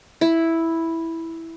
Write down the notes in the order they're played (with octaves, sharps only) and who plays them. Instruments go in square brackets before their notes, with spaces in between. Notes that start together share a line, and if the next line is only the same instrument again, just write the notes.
[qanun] E4